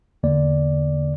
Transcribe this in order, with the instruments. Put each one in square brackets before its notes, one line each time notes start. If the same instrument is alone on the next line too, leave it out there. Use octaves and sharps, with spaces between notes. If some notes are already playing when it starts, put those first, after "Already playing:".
[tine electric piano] E2 D3 A#3 D5